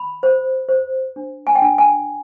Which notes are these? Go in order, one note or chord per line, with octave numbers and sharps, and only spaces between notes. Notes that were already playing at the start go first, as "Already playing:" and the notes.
Already playing: B5
C5
C5
D4
G#5
G5
D4 G#5
G#5